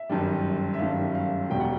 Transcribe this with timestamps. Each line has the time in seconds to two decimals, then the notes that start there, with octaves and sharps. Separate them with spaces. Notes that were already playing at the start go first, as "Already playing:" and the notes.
Already playing: E5
0.09 G1 F#2 D#3 G3
0.74 E5
0.79 G1 F#2 D#3 G3 F5
1.15 F5
1.50 E1 E2 B2 G3 G5
1.60 F#5